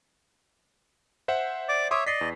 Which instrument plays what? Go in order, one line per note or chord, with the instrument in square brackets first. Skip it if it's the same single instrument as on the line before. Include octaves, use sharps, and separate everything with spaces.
[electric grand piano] C5 E5 F#5
[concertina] D5 D6
[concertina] C#5 E5 [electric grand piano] C6 D6 D#6
[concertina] D5 D#5 [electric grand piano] B6 C7
[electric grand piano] E2